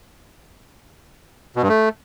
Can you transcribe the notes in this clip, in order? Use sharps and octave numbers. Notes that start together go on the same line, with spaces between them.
B2
G2
A3